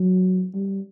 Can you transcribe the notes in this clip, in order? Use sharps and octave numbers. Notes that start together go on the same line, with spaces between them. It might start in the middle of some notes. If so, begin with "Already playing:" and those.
Already playing: F#3
G3